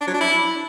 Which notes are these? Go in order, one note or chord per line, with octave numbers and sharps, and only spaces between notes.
D4
F#3
D4
E4